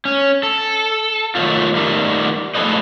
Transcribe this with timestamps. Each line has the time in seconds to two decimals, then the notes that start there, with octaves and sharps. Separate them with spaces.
0.05 C#4
0.43 A4
1.35 D#3 F3 F#3 A3 F4
1.75 D#3 G3 A3
2.55 F3 A3 G#4 A4 B4 D#5